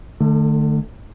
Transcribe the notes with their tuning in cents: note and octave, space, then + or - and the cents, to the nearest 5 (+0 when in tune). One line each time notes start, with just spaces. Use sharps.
D3 +40 A3 +0